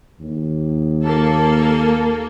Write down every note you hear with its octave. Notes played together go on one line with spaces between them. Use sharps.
D#2
A#3 A4